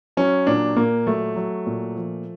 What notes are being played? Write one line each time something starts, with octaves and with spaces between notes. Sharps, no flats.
F#3 C#4
A#2 D4
A#2 A#3
F#3 A3
F#3
A#2
F3